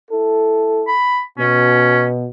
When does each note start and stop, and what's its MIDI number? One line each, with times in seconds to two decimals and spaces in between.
0.11 0.90 64
0.11 0.90 69
0.88 1.20 83
1.39 2.29 47
1.39 2.03 61